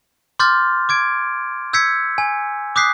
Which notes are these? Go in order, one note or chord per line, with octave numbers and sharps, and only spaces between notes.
C6 D6 F6 G6 A6
D6 G#6 D7
E6 G6 G#6 B6 C#7
G#5
D6 D#6 F#6 G6 B6 C7